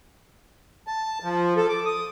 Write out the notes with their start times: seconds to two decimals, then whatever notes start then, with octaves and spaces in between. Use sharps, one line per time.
0.87 A5
1.23 F3
1.57 A4
1.69 D6
1.85 D#6